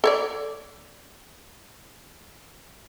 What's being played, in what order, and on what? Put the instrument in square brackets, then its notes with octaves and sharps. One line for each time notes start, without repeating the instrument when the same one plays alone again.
[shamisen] A4 C#5 D5